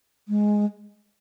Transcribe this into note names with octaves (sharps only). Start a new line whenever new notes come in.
G#3